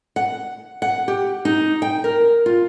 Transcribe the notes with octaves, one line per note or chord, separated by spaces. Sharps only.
F#5
F#5
G4
D#4
G5
A#4
F4